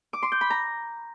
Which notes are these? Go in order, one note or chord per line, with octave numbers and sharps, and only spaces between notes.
D6
C6
G6
B5
A#5